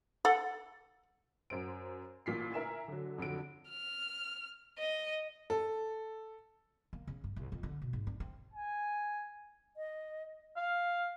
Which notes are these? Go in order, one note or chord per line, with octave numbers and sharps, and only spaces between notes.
A4 F#5
F#2 C5 D7
A1 A#2 B6 C7
E4 A#4 E5 G#5 E7
D3 F#3
F2 D3 F#3 D7
F6
D#5
A4
A#3
C#3
G2
C2
F2
D3
B2
G#2
D4
C4
G#5
D#5
F5